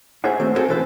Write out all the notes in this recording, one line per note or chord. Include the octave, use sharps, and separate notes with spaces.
G#4 C5 C#5 E5 F#5
D#3 A3 C4 C5
G#3 B3 C4 G#4 A4
E3 G#3 A4 B4 C5